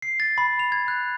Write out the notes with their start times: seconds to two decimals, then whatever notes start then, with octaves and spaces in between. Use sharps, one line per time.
0.02 C7
0.20 A6
0.38 B5
0.59 F7
0.72 G#6
0.88 F#6